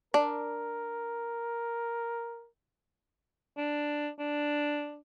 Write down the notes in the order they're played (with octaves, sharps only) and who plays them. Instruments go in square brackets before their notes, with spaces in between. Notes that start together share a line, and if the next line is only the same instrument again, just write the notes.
[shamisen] D4 [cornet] A#4
[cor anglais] D4
D4